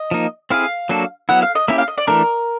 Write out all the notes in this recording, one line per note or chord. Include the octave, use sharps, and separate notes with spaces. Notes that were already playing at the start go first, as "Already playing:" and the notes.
Already playing: D#5
F3 A#3 D#4
C4 E4 G#4 F5
F#3 A#3 D4 F#4 A4
F#3 B3 E4 F#5
F5
D#5
A#3 C#4 E4 G4 E5
F5
D#5
D5
E3 A3 D4 A#4